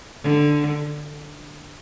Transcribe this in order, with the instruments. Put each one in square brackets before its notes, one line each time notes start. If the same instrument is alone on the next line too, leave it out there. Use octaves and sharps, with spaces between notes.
[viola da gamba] D3